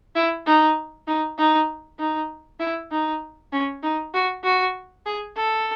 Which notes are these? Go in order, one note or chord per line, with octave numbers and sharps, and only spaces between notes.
E4
D#4
D#4
D#4
D#4
E4
D#4
C#4
D#4
F#4
F#4
G#4
A4